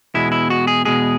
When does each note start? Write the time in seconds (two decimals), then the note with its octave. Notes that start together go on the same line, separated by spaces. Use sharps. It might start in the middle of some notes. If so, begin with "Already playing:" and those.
0.14 E2 B2 G#3 E4
0.32 E4
0.50 F#4
0.67 G#4
0.85 E2 B2 G#3 G#4